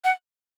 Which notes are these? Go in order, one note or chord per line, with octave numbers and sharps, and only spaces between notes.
F#5